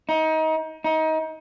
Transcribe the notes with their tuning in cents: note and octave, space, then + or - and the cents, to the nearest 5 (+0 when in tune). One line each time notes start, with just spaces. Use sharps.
D#4 +25
D#4 +25